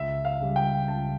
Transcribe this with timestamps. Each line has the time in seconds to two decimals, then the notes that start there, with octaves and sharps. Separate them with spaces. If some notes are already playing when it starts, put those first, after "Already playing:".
Already playing: C#2 E5
0.25 F5
0.41 C#3 G3
0.56 G5
0.88 C#2 A5